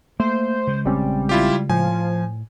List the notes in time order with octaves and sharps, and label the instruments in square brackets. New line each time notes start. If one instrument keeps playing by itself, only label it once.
[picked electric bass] A3 [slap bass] A#3 [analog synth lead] C5
[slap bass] C#3 G#3
[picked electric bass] A#1 C4 C#4 [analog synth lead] G3
[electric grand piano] E4 F4 G4
[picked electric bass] A2 [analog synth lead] F3 [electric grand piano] G#5